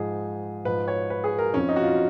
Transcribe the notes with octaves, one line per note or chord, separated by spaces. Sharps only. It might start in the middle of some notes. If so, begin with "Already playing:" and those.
Already playing: G#2 F3 G#4
G#2 F3 B4
C#5
B4
G#4
A#4
F2 F3 C#4
D#4
F#4
F4